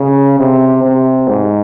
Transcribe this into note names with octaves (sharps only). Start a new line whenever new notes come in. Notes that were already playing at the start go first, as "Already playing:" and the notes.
Already playing: C#3
C3
C3
G#2